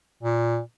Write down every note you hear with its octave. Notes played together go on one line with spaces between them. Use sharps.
A#2